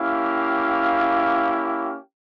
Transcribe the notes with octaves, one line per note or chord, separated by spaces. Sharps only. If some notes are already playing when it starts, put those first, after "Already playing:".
Already playing: A#3 C#4 E4 G4 F5